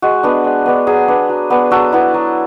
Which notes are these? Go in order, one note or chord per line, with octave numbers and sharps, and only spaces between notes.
G#3 F#4
B3 D4
G#3
B3 D4
F#3 G#4
B3 D4
F#3
B3 D4
F#3 F#4 A4
B3 E4
F#3